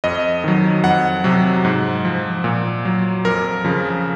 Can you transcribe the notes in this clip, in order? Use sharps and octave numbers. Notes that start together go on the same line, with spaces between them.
F2 D#5
D#3 F#3
F2 F#5
C3 F#3
G#2
F3
A#2
F#3
F2 A#4
C#3 F3